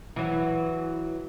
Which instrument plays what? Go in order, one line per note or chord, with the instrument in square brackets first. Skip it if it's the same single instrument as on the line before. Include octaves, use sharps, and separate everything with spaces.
[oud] E3 F#3